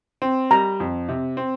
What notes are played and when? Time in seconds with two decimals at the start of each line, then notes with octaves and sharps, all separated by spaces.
0.22 C4
0.51 G3 A#5
0.80 F2
1.09 C3
1.37 C4